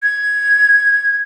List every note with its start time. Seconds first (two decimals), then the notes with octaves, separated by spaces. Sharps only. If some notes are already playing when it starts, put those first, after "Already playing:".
0.03 G#6